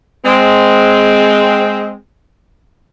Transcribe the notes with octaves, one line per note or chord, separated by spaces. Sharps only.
G#3 C4